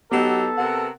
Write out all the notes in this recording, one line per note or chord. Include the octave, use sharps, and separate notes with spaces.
F#3 B3 D#4 G4 A4
C3 A#4 F#5